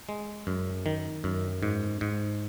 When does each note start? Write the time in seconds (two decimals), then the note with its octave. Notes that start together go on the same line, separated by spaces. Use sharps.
0.09 G#3
0.47 F#2
0.86 D#3
1.24 F#2
1.63 G#2
2.01 G#2